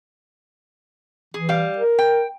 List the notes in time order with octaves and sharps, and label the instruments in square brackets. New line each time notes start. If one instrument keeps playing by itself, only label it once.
[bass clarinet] E3 [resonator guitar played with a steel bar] G#4
[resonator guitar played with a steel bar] G3 F5
[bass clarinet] A#4
[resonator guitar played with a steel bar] G5